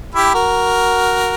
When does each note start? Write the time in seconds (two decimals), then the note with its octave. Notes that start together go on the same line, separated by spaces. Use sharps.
0.15 E4 G4
0.34 F#4 A#4